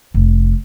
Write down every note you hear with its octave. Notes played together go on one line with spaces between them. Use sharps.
F1